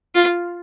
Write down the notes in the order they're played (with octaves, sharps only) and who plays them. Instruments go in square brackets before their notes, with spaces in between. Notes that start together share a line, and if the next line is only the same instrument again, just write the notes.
[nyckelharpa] F4